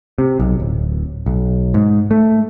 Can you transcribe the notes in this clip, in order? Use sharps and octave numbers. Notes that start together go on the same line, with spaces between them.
C3
B1
D1
B1
G#2
A3